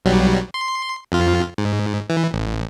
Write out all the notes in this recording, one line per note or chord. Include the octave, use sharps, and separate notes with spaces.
B1 F#3 G3
C6
F2 F4
G#2
E3
A1